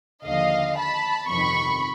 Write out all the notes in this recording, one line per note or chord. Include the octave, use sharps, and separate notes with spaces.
D#2 D3 F3 D#5 F5
A5 B5
G1 F2 C3 D#3 B5 C#6